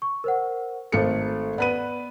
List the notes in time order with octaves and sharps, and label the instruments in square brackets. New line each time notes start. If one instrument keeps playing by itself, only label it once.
[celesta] C#6
A#4 C5 F#5
[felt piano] G#1 A3 C#7 [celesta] A4 C5
[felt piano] B3 B4 D#7 [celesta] D5